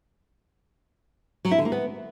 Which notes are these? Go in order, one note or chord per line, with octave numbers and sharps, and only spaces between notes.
F#3
E4
D3
A#3
B3